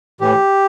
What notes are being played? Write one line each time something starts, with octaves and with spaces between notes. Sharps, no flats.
A2 E3 G4